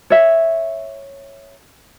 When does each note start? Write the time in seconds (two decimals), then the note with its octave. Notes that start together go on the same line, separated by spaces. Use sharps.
0.10 C#5 E5